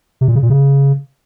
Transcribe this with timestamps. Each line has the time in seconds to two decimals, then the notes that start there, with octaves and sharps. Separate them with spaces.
0.21 C3
0.28 A#2
0.35 C#3
0.42 A#2
0.50 C#3